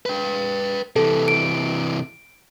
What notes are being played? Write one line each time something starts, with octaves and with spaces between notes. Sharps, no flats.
B4 G5
C3 E3 A4
D7